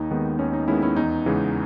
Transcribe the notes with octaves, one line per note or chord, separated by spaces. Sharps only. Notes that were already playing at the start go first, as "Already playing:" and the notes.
Already playing: D#2 D#4
D#3 G#3 B3
D#2 C#4
D#4
D#3 G#3 B3 C#4 E4
C#4 E4
E2 D#4
C#3 E3 G#3 B3